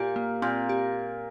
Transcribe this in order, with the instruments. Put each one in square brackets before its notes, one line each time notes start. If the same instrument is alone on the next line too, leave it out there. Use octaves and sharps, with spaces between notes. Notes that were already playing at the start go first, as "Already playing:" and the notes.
Already playing: [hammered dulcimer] A#2 [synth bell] G4
[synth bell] A#3
[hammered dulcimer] A#2 [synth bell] C4
[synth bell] G4